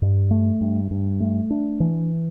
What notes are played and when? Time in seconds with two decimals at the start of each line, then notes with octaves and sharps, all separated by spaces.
0.02 G2
0.31 A3
0.61 G2
0.91 G2
1.20 A3
1.50 D4
1.80 E3